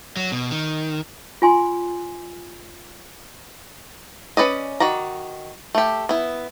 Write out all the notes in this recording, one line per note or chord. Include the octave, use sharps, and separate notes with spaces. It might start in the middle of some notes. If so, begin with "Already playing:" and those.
F#3
B2
D#3
F4 G#5 C6
C#4 B4 D5 D#5
D#3 F#4 D5 A#5
A3 G4
B3 E4